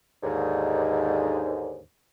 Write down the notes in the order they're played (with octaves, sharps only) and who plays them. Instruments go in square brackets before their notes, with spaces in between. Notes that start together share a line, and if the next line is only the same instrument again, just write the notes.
[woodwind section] D#2 G#2 D3